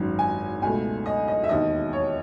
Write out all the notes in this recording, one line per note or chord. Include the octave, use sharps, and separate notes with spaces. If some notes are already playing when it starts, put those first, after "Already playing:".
Already playing: G#1 F#2 D#3 F#3
G#5
C#2 B2 A3 G#5
D#5
D#5
E5
E1 D#2 D#3 D#5
C#5